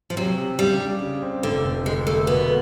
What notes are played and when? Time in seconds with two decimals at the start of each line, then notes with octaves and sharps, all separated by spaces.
0.10 F3
0.17 C3 F#3
0.38 C3
0.59 C#3 G3
0.80 D4
1.01 C#3
1.22 C4
1.43 F1 D3
1.65 F1
1.85 D2 G#3
2.07 A3 A#3
2.27 B2 B3